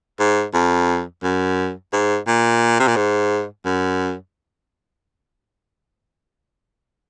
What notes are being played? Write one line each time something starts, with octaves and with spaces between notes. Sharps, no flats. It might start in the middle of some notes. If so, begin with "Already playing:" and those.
G#2
F2
F#2
G#2
A#2
C3
A#2
G#2
F#2